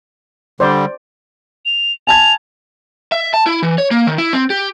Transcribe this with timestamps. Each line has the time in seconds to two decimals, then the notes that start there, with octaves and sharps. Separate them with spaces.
0.60 D3 G3 C5 D5
1.65 F7
2.07 G#5 A5 G#6 F7
3.12 E5
3.34 A5
3.46 E4
3.63 E3
3.78 C#5
3.91 A#3
4.07 D#3
4.18 E4
4.33 C4
4.50 G4